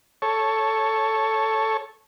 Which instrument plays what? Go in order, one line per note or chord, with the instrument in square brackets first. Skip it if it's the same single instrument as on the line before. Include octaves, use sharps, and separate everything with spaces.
[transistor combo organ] A4 C#5